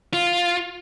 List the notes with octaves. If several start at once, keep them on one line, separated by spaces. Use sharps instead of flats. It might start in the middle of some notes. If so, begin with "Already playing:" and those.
F4